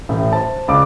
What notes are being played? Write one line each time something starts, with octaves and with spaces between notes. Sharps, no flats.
A1 A2
C5 A5
C#2 D5 D6